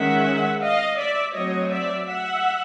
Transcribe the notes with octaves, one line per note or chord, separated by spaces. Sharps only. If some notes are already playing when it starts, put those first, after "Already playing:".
Already playing: D#3 G#3 C#4 E5 F#5
D#5 F5
D5 E5
F#3 A3 C4 C#5 D#5
D5 E5
E5 F#5